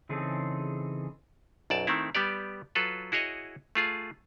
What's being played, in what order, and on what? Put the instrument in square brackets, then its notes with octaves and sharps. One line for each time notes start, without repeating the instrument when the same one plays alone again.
[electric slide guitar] C#3 E3 C4 D#4 G#4 A4
[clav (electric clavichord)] B1 F#2 D5 A5
D#3 A3 C4 E4
G3 B3 G4 D5
F#3 F4 A4 B4
E4 F#4 G#4 C#5 D#5
A3 F4 G#4